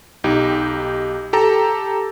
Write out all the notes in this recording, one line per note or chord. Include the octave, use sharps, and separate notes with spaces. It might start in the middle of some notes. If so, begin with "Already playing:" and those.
B1 D#4 G4
G4 A4 A#5